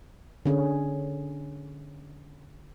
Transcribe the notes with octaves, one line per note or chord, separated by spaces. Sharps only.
D3 C#4 G#4